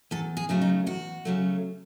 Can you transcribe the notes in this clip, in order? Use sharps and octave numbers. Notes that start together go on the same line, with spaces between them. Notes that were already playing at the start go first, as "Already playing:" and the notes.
E2 A4
G#4
C#3 F#3 A3
D#4
E2 F#4
C#3 F#3 A3